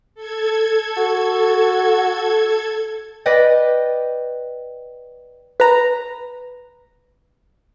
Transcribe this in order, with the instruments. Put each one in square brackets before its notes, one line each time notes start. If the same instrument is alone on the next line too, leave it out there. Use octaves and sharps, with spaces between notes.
[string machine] A4 G#6
[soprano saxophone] F#4
[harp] B4 D5 D#5 G5
[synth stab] B4 A#5